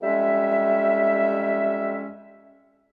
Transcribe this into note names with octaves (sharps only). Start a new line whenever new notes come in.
F2 G3 G#3 C#4 E5